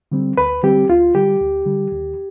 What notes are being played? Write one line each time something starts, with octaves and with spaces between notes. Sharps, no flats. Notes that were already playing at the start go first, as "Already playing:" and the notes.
D3 G3 C4
D2 B4
D3 G3 C4 G4
D2 F4
D3 G3 G4
D2
D3 G3
D#2